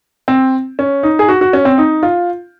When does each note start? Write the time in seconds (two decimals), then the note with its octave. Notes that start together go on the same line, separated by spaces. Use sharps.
0.28 C4
0.79 C#4
1.03 D#4
1.19 G#4
1.29 F#4
1.41 F#4
1.53 C#4
1.65 C4
1.78 D#4
2.03 F4